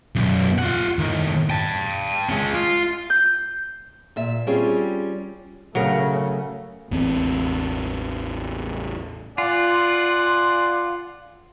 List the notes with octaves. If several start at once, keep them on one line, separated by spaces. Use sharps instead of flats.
B1 F#2
F4 F#5
A2 D#3
G5 A5
G#3 C#4
F4
G6
A#2 E5
G3 C4 C#4 F4 G#4
C#3 F#3 A3 A#4
A1 E2 C4
F4 D5 F#5 G#5